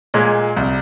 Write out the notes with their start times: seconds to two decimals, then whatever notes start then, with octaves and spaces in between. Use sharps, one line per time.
0.14 A#2 G#3
0.56 C2